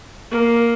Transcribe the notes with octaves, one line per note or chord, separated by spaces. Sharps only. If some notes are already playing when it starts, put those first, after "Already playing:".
A#3